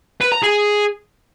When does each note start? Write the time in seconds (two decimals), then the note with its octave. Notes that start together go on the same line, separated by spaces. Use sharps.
0.21 B4
0.32 A#5
0.43 G#4